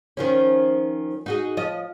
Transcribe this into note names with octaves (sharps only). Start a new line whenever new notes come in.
D#3 F3 C#4
D#4 F#4 G#4
F3 D#5